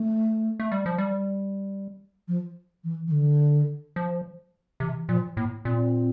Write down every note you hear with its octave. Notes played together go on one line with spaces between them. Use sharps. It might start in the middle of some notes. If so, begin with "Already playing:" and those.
Already playing: A3
A3
G3
F3
G3
F3
E3
E3
D3
F3
C3 E3
A#2 F3
A2 A#3
A#2 C4